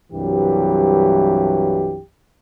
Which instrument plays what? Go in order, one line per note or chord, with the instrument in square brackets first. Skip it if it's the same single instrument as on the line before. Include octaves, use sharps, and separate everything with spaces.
[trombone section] C2 G2 E3 F#3 G4